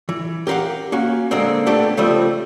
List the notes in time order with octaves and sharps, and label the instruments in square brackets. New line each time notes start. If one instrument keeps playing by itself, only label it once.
[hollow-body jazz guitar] E3
G4 A#4 B4 F5 F#5
A#3 C#4 F#4
D3 G#3 A#3 C4
A3 B3 D4 G4 A4
C#3 F3 G3 A3 C4